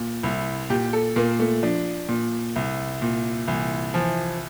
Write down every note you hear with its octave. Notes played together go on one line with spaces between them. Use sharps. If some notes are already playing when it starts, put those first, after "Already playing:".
Already playing: A#2
C2 E4
A#2 G4
A4
A#2 A#3
A3
F3 D4
A#2
C2
A#2
C2 E3
E3 F3